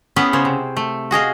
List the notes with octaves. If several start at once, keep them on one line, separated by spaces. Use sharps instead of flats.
B3 C#4 E4 G#4 B4
C#3 C5 C#5
C3
A3
F#4 G#4 D#5 F5